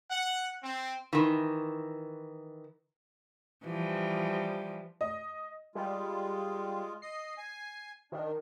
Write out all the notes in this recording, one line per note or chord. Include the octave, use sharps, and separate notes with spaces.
F#5
C4
D#3 E3
E3 F3 G3
D#5
G3 G#3 F4
D#5 C7
G#5
D#3 D4